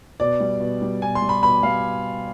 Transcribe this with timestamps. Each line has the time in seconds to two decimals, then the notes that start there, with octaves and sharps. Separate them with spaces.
0.20 B2 D5
0.40 G3
0.61 B2
0.82 G3
1.02 B2 G#5
1.15 C6
1.22 G3
1.29 B5
1.43 B2 B5
1.63 G3 F5